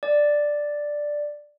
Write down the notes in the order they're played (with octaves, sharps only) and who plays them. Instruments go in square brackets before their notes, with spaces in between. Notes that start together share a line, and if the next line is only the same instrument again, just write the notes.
[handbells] D5